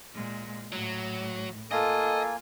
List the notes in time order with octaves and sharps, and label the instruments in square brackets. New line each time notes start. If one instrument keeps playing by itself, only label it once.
[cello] A#2 G#3
[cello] A2 [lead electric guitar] F#3
[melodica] A#3 G#5 [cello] F4 [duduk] A4 [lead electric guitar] D#5